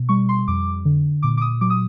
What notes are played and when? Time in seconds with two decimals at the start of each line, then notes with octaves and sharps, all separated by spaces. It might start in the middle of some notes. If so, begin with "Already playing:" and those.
Already playing: B2
0.09 G3 C#6
0.29 C6
0.48 F2 D6
0.85 D3
1.22 A#2 D6
1.37 D6
1.41 D#6
1.61 F#3 D6
1.70 D#6